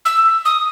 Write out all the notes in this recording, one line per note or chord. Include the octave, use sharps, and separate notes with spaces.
E6
D#6